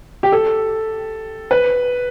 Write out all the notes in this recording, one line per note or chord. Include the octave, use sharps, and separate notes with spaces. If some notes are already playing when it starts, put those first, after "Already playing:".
G4
A4
B4